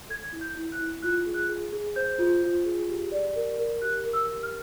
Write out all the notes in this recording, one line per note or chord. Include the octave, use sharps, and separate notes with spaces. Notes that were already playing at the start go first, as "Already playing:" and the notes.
A4 G#6
E4
G6
E4
F#6
E4
F4 F#6
G#4
F#6
G#4
G#4
C5 G6
F4
F4
G#4
G4
D5
A#4
A#4
G4 F#6
A#4
E6
G4
F6